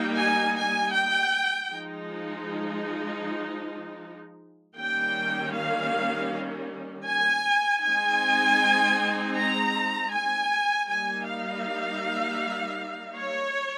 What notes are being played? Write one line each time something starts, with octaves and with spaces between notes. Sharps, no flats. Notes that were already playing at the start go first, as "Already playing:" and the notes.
Already playing: G3 A#3 D#4 G5
G#5
G#5
G5
F3 G#3 D#4
D#3 G3 A#3 C#4 G5
F5
G#5
G#3 C4 D#4 G#5
A#5
G#5
G3 A#3 D#4 G#5
F5
C#5